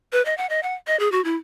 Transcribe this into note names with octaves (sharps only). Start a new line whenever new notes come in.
B4
D#5
F#5
D#5
F#5
D#5
G#4
F#4
E4